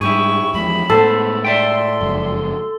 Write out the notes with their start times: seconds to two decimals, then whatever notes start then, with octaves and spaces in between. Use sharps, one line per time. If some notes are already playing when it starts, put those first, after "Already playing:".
0.01 G#2 G3 E4 G4 G#4 C#6
0.53 E2 F3 G#3 B5
0.90 A2 G#3 B3 A4 C5
1.45 D5 E5 G5 C6
2.01 F#1 F2 G#3